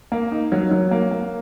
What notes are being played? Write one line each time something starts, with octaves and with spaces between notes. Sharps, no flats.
A#3
D#4
F#3
F#3
A#3
A#3